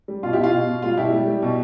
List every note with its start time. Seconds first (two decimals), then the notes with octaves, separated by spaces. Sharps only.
0.08 G3
0.23 B2 F4
0.33 E4 G4
0.38 B2
0.44 F4
0.53 B2
0.67 B2
0.82 G3 F4
0.97 B2 E4 G4
1.12 G3
1.27 G3
1.42 B2